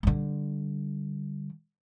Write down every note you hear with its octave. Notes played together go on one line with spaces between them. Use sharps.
D3 G3